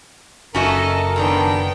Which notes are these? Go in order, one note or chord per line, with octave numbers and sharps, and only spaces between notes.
F#1 C#4 F#4 A4 A#4 D#5 E5
F#2 D#3 B3 D4 G5